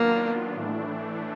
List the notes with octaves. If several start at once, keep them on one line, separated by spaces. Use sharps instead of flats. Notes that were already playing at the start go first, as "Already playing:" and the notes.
Already playing: D#3 F#3 A#3 B3 D4 F4
A2 E3 A3 D4